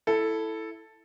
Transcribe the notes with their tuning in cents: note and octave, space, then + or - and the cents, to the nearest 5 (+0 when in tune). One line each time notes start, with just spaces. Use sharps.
E4 +0 A4 +0